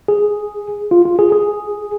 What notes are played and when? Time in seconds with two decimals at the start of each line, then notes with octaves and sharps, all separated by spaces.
0.08 G#4
0.91 F4
1.05 F4
1.19 G#4
1.32 G#4